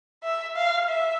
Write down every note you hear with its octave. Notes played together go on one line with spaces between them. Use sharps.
E5
F5
E5